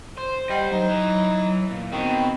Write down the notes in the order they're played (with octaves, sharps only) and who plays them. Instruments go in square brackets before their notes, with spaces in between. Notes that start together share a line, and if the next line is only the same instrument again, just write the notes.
[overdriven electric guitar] C5
[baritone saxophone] G3 [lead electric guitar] D#5 F#5
[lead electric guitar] F#3 [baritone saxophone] D#4
[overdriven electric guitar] E3
[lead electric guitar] A#2
[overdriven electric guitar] B2 [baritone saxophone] D#3 [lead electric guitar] C4